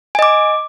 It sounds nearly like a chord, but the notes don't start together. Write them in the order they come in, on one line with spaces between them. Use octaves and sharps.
G#5 D#5 D6